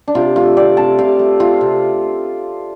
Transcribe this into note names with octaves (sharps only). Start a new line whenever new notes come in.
D4
C3 F4
A3 F4
C4 D5
C3 A5
C3 F5
A3
C4 F4
C3